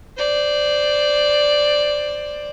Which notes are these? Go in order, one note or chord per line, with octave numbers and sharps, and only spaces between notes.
C5 D5